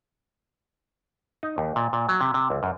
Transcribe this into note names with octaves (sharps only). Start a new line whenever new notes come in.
D#4
D#2
A#2
A#2
F#3
C3
C3
C#2
F#2